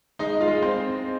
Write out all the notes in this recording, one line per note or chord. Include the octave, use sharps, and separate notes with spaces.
G#3 D#4 D#5
F4 F5
G#3
C4 C5